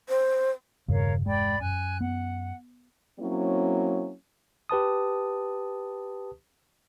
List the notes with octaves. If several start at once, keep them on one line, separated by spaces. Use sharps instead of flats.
C5
E1 G2 C#3 A#4 C#5 F5
G#3 D5 G5 B5
F#2 G#5 F#6
B3 F#5
F#3 A#3 C4 C#4 E4
G4 B4 A5 D#6